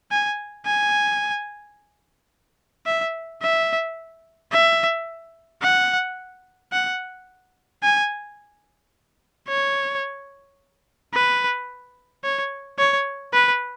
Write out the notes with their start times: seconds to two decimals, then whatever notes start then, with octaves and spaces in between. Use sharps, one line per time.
0.11 G#5
0.66 G#5
2.86 E5
3.42 E5
4.52 E5
5.62 F#5
6.73 F#5
7.83 G#5
9.48 C#5
11.13 B4
12.24 C#5
12.79 C#5
13.33 B4